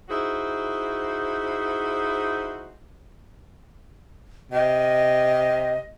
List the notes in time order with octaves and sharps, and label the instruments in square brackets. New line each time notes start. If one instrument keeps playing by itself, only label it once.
[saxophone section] D#4 E4 F#4 G#4 C5
[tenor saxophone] C3 [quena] D#5